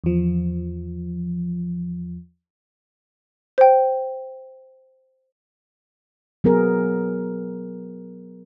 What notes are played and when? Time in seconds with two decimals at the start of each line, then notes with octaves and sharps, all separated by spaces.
0.04 E2 F3
3.58 C5 G5
6.44 F#3 B3 G#4 A#4